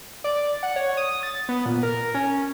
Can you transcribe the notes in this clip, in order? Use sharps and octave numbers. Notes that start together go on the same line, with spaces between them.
D5
F#5
C#5
D#6
A6
B3
A#2
A#4
C#4